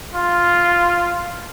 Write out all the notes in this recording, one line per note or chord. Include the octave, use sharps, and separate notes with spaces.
F4